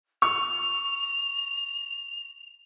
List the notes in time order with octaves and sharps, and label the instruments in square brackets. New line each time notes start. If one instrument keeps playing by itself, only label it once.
[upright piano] C#6 [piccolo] F7